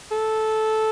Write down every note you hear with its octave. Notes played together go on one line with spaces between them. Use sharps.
A4